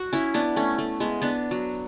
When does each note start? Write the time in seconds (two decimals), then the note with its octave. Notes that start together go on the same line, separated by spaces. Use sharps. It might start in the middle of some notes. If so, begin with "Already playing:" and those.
Already playing: F#4
0.13 C#4 E4
0.34 B3 D4
0.56 A3 C#4
0.78 A3
1.00 G#3 B3
1.22 B3 D4
1.51 F#3